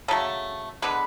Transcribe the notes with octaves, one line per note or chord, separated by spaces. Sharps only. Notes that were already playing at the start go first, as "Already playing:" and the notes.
C#3 F#3 A3 A4
D3 G#3 B3 B4